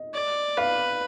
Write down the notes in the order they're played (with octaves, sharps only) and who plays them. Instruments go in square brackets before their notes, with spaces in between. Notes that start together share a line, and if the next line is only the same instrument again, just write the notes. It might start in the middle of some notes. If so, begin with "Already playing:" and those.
Already playing: [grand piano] D#5
[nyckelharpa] D5
[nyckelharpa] B4 [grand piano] F5